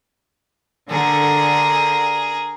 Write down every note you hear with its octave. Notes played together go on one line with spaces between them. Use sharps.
D3 G#4 A#4